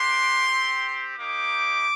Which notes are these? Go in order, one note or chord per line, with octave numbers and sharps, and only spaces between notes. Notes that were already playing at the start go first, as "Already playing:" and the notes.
Already playing: A#3 D4 G4 C6
C4 G4
A#3 D#4 G4 D6